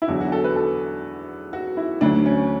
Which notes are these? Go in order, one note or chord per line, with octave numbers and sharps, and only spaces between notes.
E4
E2 D3 F#3 F#4
F#4
A4
B4
A4
F#4
E4
D2 D3 F#3 D4
C#4